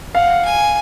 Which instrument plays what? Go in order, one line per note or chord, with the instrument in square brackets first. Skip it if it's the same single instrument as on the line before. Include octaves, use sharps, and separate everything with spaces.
[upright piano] F5 [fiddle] F#5
[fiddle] G#5